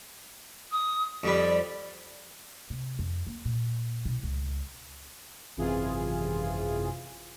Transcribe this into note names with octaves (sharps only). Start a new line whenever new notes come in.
D#6
F2 G3 B4 D5
C3
F2
A#3
A#2
B2 E4
C#2
G#1 F#2 C3 E3 F4 G#4